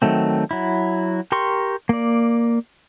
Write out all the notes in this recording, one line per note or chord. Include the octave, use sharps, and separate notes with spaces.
D#3 F#3 A3 C4
F#3 E4
G4 A#4 C6 C#6
A#3 D5